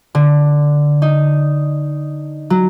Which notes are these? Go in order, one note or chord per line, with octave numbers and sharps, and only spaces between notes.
D3
D#4
F#3